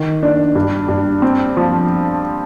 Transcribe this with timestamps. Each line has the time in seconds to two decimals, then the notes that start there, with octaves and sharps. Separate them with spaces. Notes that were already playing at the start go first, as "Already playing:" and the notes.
Already playing: D#3
0.23 D4
0.55 G2
0.89 G2
1.22 C4
1.57 F3